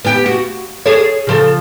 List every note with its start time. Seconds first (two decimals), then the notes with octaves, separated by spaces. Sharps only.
0.05 B3 G4
0.26 F#4
0.86 G#4 A4 C#5
1.27 C#3 F3 A4